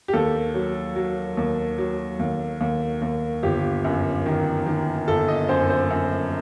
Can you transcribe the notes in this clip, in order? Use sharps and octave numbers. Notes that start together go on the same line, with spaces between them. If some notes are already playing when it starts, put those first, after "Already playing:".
G4
D#2 A4
F#3
F#3
D#2
F#3
D#2
D#2
D#2
G1 G4
F#2
D#3
D#3
G1 A4
D#5
F#2 C5
C5
F#2